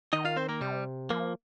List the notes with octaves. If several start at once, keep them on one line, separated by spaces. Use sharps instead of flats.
D#3 D#4 D#5
F4 F5
C4 C5
A#3 A#4
C3 G3
F3 A#3